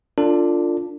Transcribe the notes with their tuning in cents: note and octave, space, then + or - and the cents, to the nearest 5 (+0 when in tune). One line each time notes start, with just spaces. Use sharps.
D4 +0 F4 +0 A4 +40